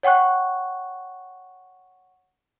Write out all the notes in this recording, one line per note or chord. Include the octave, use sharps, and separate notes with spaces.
C#5 F#5 G5 C#6 F#6